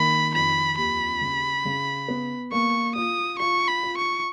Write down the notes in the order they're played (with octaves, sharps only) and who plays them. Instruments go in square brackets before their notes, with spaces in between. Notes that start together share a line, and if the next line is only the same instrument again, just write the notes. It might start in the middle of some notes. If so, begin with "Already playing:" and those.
Already playing: [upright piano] D#3 A#3 [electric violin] B5
[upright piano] F2 [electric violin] B5
[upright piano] D#2 [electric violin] B5
[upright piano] C#3
C#3
B3
[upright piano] A#3 [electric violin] C#6
[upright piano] F4 [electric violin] D#6
[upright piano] F4 [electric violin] C#6
[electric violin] B5
[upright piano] F4
[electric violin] C#6